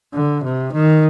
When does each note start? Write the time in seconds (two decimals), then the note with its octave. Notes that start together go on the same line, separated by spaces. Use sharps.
0.14 D3
0.43 C3
0.73 D#3